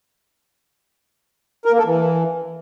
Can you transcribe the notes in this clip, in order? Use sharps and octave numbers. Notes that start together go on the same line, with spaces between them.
A#4
A#3
A4
E3